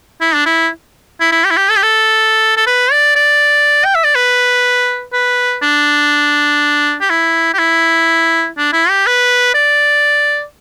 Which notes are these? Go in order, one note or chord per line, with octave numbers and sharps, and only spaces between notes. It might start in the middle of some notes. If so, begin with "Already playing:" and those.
E4
D4
E4
E4
E4
G4
E4
G4
A4
G4
A4
A4
B4
D5
D5
G5
E5
D5
B4
B4
D4
G4
E4
G4
E4
D4
E4
G4
B4
D5